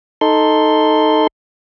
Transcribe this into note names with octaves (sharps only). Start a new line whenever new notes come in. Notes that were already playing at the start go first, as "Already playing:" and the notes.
D#4 A4 C6